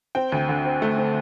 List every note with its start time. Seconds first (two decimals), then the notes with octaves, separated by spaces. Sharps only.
0.15 C4 G5
0.32 D2
0.49 D3
0.65 C4
0.82 A3
0.98 C4